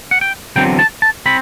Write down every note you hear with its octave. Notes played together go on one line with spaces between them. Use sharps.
F#5
G5
E2 D3 F#3 C4 G5
A5
A5
C4 B5